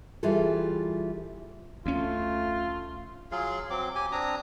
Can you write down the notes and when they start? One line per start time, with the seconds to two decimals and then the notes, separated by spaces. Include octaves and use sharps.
0.23 E3 G3 F4 G#4 A4
1.86 D2 A3 C#4 F4
3.32 F#3 F4 G#4 F5
3.70 F#3 C4 D6
3.95 G4 G#5
4.12 C4 D4 A#5 D#6